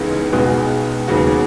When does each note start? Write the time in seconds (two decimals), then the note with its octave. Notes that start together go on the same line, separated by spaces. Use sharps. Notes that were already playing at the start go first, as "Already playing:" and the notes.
Already playing: C#2 C#3 E3 G#3 B3 D#4
0.32 C#2 B2 G#3 B3
1.08 D#2 C#3 F#3 B3 F#4